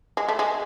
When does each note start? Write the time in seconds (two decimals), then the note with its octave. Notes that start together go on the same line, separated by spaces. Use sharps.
0.17 G#3
0.29 A3
0.39 G#3